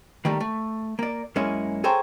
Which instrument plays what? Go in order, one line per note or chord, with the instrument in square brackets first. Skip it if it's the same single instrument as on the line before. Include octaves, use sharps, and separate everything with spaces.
[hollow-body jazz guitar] D#3 G3 A3 A#3
A3
A#3 D5
F#2 G#3 A#3 C#4 E4 G#4
G#4 A4 C5 C#5 G5 A#5